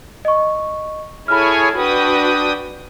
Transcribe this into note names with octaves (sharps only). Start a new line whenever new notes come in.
D#5 C#6
E4 G#4 A4 C#5 G#5 B5 F6
D4 F#4 B4 G5 D#6